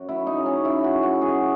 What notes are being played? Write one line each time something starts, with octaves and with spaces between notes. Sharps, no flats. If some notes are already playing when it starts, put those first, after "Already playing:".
Already playing: F#2
F#3 E4
D#4
C#3
C#4
C#3 E4
F#4
F#2
F#4
B2 G#4